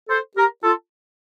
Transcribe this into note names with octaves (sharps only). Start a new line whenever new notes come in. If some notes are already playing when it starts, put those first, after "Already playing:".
A4 C5
G4 A#4
F4 A4